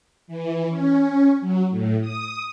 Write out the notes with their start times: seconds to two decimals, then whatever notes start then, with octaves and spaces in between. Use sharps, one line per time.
0.27 E3
0.69 C#4
1.41 F#3
1.70 A2
2.01 D#6